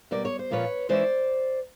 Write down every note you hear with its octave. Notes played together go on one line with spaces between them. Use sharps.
B2 G3 A#3 D5
C#5
C5
A#2 F3 A#3 C#4 F4 B4 C#5
E3 G#3 C#4 E4 C5 D5